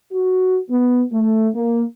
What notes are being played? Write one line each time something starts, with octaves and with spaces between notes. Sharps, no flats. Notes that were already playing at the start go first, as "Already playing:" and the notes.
F#4
B3
A3
A#3